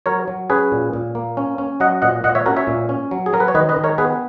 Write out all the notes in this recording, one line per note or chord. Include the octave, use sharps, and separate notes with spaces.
F#3 A#4 C#5
F#3
C#4 G#4 B4
A#2
A#2
A#3
C#4
C#4
F#3 D#5 F#5
A#2 D#5 F#5
A#2 D#5 F#5
C#5 E5
C#4 F#4 A#4
C#5 E5
A#2
C#4
F#3
G#4
F#3 A#4
B4
C#5
D#3 B4 D#5
B4 D#5
D#3
A#4 C#5
B3 G#4 B4